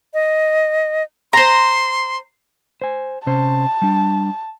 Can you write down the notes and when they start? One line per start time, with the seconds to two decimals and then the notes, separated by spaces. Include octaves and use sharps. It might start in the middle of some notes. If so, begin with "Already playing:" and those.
0.14 D#5
1.33 C5 A#5 C6
2.82 C5 G#5
3.26 C3 C#4 C5 A5
3.82 G3 D4